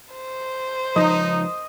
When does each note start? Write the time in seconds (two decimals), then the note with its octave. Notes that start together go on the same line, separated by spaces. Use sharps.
0.14 C5
0.96 C#2 G2 F3 D#4 D#5